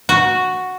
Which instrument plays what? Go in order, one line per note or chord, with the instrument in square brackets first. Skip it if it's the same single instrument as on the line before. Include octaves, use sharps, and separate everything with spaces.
[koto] F#4